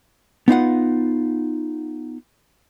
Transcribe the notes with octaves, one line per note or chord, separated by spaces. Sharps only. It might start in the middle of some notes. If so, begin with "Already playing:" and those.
B3 D#4 F4 F#5